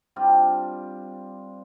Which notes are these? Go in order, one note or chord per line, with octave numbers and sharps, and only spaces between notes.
G3 C4 D4 F4